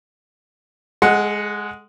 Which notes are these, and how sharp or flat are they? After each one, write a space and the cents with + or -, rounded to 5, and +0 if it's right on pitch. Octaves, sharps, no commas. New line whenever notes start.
G#3 +0 A4 -40 F#5 +0